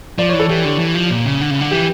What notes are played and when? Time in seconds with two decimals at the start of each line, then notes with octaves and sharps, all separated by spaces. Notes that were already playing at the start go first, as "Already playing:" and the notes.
0.18 F3 D5
0.29 E3 C#5
0.39 A4
0.49 E3 G4
0.65 D3
0.79 E3
0.95 F3
1.10 A#2
1.25 C#3
1.41 D3
1.51 C#3
1.61 D3
1.71 E3 G4